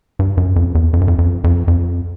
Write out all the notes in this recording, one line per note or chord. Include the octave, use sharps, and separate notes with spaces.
G2
F#2
F2
E2
F2
F#2
F2
F2
F2
F2